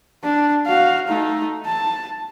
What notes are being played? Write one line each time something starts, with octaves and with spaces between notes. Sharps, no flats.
D4
F#4 F5
A3 D#4
A5